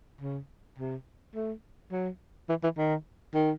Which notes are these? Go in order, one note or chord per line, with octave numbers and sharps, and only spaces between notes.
C#3
C3
A3
F#3
E3
E3
D#3
D#3